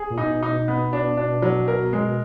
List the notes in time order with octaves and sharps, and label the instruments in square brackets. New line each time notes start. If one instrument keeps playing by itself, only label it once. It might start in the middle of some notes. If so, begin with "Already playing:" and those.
Already playing: [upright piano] G#4
[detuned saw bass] A#2
[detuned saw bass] B2 [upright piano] D#4
[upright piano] D#4
B3
D4
D4
F#3
A#4
G#3